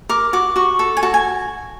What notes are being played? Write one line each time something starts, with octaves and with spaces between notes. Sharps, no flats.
A#4 D6
F#4 D6
F#4 C#6
A4
G#5
F#4 A5
G#5